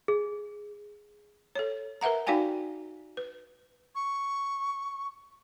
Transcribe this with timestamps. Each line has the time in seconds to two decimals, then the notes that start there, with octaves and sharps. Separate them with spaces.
0.08 G#4
1.55 A4 C#5
2.01 A#4 B4 E5 F#5 A#5
2.27 D#4 F#4 D5 F5 G5 G#5
3.17 B4
3.95 C#6